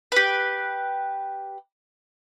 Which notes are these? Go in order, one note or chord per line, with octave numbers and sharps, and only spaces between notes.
G4 B4